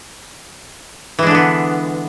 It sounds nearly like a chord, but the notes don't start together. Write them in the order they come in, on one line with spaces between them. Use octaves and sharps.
E3 G#3 D4 D3 B3